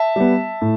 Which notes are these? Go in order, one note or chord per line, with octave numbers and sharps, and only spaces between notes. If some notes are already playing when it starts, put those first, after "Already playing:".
Already playing: E5 A5
G3 B3
A2